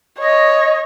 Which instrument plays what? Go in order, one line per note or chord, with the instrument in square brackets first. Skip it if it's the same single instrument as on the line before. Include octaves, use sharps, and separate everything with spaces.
[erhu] C#5 [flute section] D#5